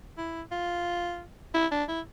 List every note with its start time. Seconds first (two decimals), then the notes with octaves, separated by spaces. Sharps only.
0.18 E4
0.52 F4
1.54 E4
1.71 D4
1.88 E4